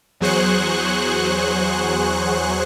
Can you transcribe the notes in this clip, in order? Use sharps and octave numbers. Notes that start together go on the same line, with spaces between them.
E2 F#3 G#4 C5 C#6 F#6